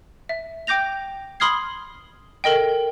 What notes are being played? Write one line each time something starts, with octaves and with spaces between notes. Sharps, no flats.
E5
G5 D6 G6 A#6 F7
B5 C6 D#6 F6 G#6 C7
A4 A#4 D#5 G5